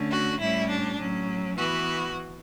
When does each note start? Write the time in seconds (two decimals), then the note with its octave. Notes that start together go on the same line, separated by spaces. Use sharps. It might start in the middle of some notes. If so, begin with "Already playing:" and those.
Already playing: D3 A3 C#4
0.11 F#4
0.39 A2 G3 C#4 E4
0.69 D4
0.99 A2 F#3 C#4
1.56 E3 B3 F#4